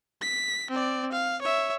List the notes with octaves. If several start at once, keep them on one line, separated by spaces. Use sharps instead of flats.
B6
C4 D5
F5
C#5 E5